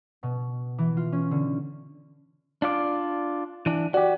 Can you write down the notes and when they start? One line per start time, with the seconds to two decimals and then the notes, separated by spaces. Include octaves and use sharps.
0.23 B2
0.78 E3
0.97 F4
1.12 C#4
1.31 D3
2.62 D4 F4 D5
3.66 E3 D4
3.94 F#4 G4 D5